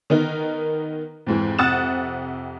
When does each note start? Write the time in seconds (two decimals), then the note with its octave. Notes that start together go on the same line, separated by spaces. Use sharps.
0.10 D#3 B3 D#4 A#4
1.26 F2 G#2 E3
1.58 F2 C3 F#5 D#6 A6 E7